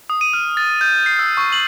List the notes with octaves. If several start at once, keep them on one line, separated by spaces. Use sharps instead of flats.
D#6
D#7
F6
A6
G6
C7
E6
C#6
F#7